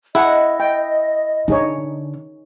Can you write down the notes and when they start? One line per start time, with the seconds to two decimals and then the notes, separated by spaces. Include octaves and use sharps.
0.15 E4 G#4 D#5 F#5
0.60 G5
1.48 D3 D#4 G#4 C#5